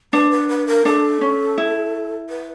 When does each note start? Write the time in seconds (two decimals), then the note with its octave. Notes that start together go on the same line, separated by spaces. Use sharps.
0.13 D4 B4
0.31 B4
0.49 B4
0.67 A#4
0.85 D4 A4
1.21 C#4
1.58 E4
2.29 B4